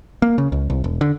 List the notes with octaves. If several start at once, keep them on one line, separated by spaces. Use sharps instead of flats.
A#3
C#3
C#2
C2
E1
D3